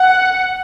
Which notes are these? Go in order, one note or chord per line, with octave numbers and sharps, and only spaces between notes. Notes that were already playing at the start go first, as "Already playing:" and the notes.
Already playing: F#5